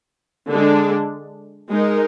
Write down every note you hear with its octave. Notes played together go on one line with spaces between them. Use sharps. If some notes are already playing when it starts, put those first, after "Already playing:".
D3 G#3 D4
G#3 D#4 A#4